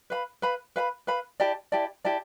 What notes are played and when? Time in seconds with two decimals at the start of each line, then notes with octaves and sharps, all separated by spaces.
0.10 B4 F5 B5
0.42 B4 F5 B5
0.76 B4 F5 B5
1.07 B4 F5 B5
1.40 E4 G4 D5 A5
1.72 E4 G4 D5 A5
2.05 E4 G4 D5 A5